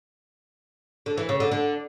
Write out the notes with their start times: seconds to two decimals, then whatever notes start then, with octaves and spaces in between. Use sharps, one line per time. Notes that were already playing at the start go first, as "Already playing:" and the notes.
1.06 D3
1.17 E3
1.29 C#3
1.40 D3
1.51 D3